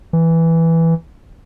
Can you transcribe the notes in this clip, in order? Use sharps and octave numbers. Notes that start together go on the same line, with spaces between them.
E3